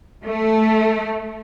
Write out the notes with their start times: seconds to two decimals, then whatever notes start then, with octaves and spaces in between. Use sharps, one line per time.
0.25 A3